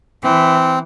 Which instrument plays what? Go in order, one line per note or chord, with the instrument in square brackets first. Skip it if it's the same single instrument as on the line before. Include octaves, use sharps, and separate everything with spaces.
[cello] E3 [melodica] C4